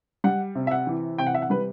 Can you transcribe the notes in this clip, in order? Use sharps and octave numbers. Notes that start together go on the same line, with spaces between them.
G3 F#5
C3
E5
F#5
E3
C3 G5
F#5
E5
F#5
G3 B4